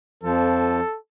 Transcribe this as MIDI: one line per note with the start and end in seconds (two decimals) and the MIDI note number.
0.23 0.80 41
0.23 0.80 53
0.23 0.97 69